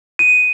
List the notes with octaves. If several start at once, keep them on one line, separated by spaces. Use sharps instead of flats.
D#7